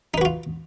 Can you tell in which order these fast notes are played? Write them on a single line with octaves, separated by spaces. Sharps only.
D#4 B4 F#4 F4